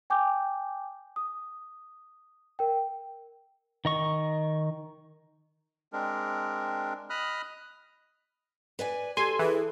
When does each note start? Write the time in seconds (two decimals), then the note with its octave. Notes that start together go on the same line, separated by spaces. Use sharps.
0.10 G5 G#5 D6 G6
1.16 D#6
2.59 A#4 G5
3.85 D#3 D#5 C#6
5.93 G#3 C4 D4 A#4
7.10 D#5 B5 D#6 F6 F#6
8.79 B4 D5 G#5
9.17 G4 A4 G#5 C6
9.39 E3 G#4